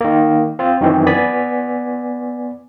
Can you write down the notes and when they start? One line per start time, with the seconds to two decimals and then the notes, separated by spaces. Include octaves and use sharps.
0.01 D#3 A#3
0.59 C4 F4
0.81 F#2 D#3 E3 C4
1.07 B3 D5 G#5 B6